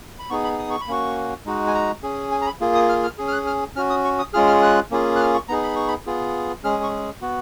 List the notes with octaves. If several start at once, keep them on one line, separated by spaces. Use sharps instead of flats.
B5
B3 D#4 G#4 C#6
B5
D#6
C#6
B5
A#3 C#4 F#4 C#6
G#3 D#4 F#4
G#5
A#5
C#4 G#4
G#5
A#5
B5
A#3 F4 G#4
D#6
F6
F6
C#4 G#4
F6
F#6
F6
C#4 F#4 F6
D#6
C#6
D#6
G#3 C#4 F4 G#4 F6
F6
F#6
A#3 C#4 F4 G#4
F#6
F6
C#6
B3 D#4 G#4 A#5
B5
C#6
B5
B3 F4 G#4
G#3 C#4 G#4 F6
C#6
B3 F#4